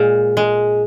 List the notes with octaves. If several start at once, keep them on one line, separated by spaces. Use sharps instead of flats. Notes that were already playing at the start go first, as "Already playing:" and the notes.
Already playing: A#2 G#3
G#3